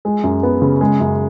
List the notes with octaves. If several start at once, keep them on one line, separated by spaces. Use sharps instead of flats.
G#3
F#2
B3
C#3
G#3
F#2